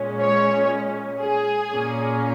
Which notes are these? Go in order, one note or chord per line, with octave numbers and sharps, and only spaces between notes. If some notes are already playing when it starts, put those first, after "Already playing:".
Already playing: A#2 G#3 C#4
C#5
G#4
A#2 A#3 C#4